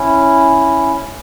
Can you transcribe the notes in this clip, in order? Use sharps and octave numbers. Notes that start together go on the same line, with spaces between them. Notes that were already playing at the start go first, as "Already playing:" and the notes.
Already playing: C#4 E4